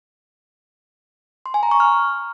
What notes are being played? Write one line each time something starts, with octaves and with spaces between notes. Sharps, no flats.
C6
G#5
A#5
C#6
F6